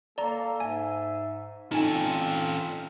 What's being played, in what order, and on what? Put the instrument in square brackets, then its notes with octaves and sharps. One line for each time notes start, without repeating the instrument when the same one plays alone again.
[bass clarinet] A#3 [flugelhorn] A4 [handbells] D5 A#5
[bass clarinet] G#2 [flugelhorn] E5 [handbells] G#5
[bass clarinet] C4 [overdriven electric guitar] C#4 A4 [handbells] D#4 G#5 [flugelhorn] F4